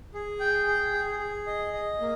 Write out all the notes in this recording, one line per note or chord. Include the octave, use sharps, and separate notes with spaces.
G#4
G5
G#4
G#4
G#4
D#5
D#5
A#3